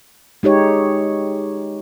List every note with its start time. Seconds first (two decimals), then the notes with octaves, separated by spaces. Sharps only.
0.43 G#3 D#4 G4 C#5